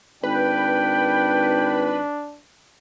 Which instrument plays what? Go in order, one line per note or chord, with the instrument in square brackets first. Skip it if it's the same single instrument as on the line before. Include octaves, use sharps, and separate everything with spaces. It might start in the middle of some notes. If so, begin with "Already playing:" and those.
[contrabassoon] G#1 [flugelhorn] D4 [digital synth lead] B4 [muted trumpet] G5